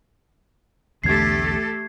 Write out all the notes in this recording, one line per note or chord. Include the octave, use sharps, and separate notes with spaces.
B1 E2 D3 A3 G4 A4 G#6 C7